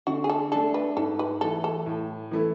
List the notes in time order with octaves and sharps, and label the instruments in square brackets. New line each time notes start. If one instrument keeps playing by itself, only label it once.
[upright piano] D3 [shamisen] F#4
[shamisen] G#4
A4
[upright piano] A3 D4 [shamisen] A4
[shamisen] B4
[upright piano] G#2 [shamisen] A4
[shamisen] B4
[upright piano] E3 A3 [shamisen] A4
[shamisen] A4
[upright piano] A2
E3 A3 E4